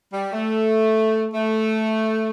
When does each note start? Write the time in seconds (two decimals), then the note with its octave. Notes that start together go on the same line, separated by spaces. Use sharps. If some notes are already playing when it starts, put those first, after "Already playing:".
0.13 G3
0.33 A3
1.34 A3